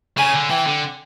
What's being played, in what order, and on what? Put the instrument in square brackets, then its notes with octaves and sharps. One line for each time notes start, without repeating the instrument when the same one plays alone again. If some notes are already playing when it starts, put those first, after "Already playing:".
[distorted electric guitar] C#3 [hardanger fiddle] G#5
[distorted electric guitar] D3
[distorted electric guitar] E3 [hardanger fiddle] G5
[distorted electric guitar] D3